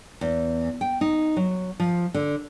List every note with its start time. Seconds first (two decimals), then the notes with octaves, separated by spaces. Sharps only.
0.21 E2
0.81 G5
1.01 D#4
1.37 F#3
1.80 F3
2.14 D3